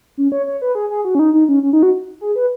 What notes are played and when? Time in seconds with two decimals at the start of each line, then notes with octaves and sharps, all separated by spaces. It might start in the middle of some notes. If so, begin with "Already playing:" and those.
0.17 C#4
0.32 C#5
0.46 C#5
0.62 B4
0.75 G#4
0.90 G#4
1.05 F#4
1.15 C#4
1.19 D#4
1.34 D#4
1.49 C#4
1.63 C#4
1.73 D#4
1.83 F#4
2.21 G#4
2.36 B4